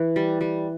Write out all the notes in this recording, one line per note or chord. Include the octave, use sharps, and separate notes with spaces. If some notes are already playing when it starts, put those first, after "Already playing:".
Already playing: E3
G3
G3